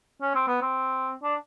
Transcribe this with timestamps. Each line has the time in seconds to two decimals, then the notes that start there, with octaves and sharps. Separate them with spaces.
0.21 C#4
0.35 C4
0.47 B3
0.62 C4
1.23 D4